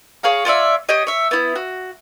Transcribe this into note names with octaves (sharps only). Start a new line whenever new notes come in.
G#4 C#5 F5 A#5
F4 C#5 D5 E5
G4 C#5 D#5
C#5 E5
B3 E4
F#4